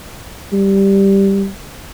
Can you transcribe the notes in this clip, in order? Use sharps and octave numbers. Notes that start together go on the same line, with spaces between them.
G3